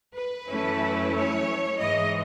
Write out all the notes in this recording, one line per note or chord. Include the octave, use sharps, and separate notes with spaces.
B4
F#2 E3 A3 C#4 E4
C#5
G#2 E3 G#3 D#5